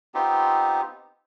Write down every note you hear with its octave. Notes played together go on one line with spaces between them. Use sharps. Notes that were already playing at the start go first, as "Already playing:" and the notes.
B3 C4 D#4 F4 G4